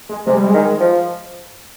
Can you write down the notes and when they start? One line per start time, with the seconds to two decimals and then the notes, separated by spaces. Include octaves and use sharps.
0.09 G#3
0.26 C3 G#3
0.37 G3
0.47 G#3
0.54 D#3
0.80 F3